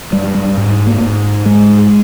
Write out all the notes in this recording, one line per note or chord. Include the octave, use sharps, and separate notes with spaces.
G2 G3
G3
G#2
A#3
G#2
G#2 G#3